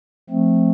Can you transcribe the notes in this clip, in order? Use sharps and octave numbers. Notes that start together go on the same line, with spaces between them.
F3 A3 C4